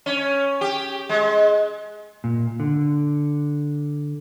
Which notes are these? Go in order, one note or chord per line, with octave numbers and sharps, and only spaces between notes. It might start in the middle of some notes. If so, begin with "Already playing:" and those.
C#4
G4
G#3
A#2
D3